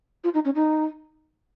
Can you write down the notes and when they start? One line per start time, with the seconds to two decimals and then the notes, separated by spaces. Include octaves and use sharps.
0.24 F4
0.34 D#4
0.45 C#4
0.55 D#4